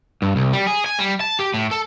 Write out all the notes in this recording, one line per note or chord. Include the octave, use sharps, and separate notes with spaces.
G2
C2
G3
G#4
G#5
G3
A5
G4
A2
A4